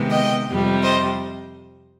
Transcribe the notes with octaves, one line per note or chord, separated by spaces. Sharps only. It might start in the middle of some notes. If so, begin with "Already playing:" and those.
Already playing: C3 D#3 G#3 B3
D#5 G5
F2 C3 G3
C5 D#5